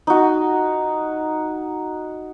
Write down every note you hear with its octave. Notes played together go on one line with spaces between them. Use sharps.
D#4 F#4